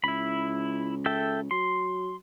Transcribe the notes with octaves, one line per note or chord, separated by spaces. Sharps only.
C#2 E4 B5
A4 E5 G5
F#3 C6